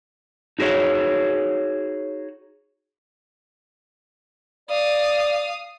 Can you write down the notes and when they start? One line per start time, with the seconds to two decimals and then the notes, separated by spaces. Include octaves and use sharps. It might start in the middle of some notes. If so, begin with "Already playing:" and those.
0.59 D#4 F#4 G#4 C#5
4.70 D5 F5 D#6